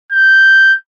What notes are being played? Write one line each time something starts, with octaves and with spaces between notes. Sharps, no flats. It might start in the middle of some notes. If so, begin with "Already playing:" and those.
G6